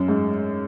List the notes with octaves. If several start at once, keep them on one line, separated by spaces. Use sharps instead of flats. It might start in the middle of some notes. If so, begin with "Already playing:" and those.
Already playing: F#2
G#2